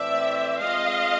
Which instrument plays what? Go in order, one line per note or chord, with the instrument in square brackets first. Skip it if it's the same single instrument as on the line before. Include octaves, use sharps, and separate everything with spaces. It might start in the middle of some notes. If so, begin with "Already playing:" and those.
Already playing: [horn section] A2 E3 A3 C4 [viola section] D5 E5
[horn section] G#3 C4 F4 [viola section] D#5 F5